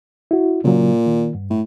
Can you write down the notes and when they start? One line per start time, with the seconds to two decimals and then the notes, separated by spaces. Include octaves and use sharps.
0.31 E4 F#4
0.64 A#2 C#3 F#3
1.06 D#3
1.35 G2
1.50 A2